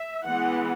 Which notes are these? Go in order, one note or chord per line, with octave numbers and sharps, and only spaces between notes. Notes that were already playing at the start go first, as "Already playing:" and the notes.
Already playing: E5
E3 G#3 B3 F#5